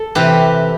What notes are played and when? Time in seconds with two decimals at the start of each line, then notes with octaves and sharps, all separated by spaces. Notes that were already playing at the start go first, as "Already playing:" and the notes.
Already playing: A4
0.15 C3 E3 G4 B4